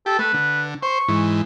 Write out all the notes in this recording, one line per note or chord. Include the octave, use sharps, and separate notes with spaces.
G4 A4
A3 B4
D3
C5 C#6
G#2 E3